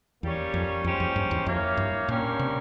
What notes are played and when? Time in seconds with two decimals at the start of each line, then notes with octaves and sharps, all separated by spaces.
0.23 E2 G3 A#3 C#4 G4 C#5
0.54 F2
0.84 F2 A#2 G#3 C#4 G4 C5
1.00 F2
1.16 G2
1.31 E2
1.47 F2 A#3 E4 G4 C#5 F5
1.77 G2
2.08 G2 A#2 G3 A#3 C#4 G4
2.39 C3